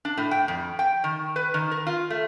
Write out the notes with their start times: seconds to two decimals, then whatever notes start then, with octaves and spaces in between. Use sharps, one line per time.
0.05 D4
0.18 A2
0.31 G5
0.48 F2
0.79 G5
1.04 D#3
1.36 B4
1.54 D#3
1.71 A#4
1.87 F4
2.10 A3